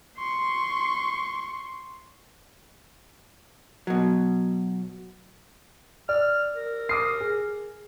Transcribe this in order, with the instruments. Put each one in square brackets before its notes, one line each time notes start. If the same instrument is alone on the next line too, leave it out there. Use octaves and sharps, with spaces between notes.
[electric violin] C6 C#6
[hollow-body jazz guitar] B2 F#3
[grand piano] D5 [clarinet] F6
[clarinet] A#4
[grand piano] D6 D#6 C7
G#4